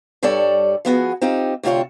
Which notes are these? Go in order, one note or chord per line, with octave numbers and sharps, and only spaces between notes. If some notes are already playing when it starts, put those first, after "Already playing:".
G2 G3 A4 C#5 D5 A5
F3 B3 F#4 G#4
C4 D#4 F4 G4
D2 C3 C4 F4 C#5